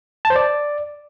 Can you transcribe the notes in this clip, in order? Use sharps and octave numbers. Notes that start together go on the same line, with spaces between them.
A5
C5
D5